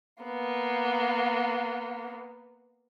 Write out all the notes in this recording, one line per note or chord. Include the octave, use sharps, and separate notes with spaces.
A#3 B3